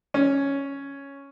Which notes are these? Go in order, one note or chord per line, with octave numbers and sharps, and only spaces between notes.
C#4